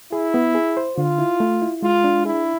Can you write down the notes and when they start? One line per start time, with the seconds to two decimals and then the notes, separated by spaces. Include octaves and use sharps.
0.12 E4 G#4
0.34 B3
0.55 G#4
0.77 C5
0.97 D3 F4
1.19 E4
1.40 A3
1.62 E4
1.82 G#3 F4
2.04 D4
2.25 E4 G#4